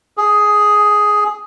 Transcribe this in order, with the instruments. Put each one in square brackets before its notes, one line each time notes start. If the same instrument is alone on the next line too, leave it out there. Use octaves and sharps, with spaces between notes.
[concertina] G#4